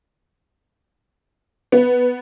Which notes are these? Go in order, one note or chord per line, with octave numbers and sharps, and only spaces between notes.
B3 B4